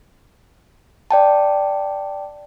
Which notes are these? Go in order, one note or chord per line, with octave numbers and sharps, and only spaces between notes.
D5 G5 A5